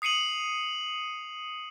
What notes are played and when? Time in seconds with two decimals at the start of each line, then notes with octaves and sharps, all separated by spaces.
0.02 D#6 C7 C#7 D#7 F#7